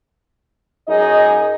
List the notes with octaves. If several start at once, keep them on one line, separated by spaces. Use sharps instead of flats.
F#2 D#4 G#4 D#5